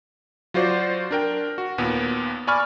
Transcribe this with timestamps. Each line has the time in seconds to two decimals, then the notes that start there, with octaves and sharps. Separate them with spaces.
0.54 F#3 F4 F#4 C5 D5
1.11 D4 A#4 G5
1.58 F#4
1.78 D#2 A#2 B3
2.47 D5 G#5 B5 C#6 F6